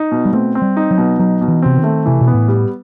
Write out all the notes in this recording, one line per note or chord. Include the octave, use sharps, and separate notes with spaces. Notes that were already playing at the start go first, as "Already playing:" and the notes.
Already playing: D#4
B2
G3
A3 C4
C4
G3
D#4
F#3
B2
F#3 D#4
B2
E3
C3 C4
D#3
A3
C3 E3
B2
B3
A2
G3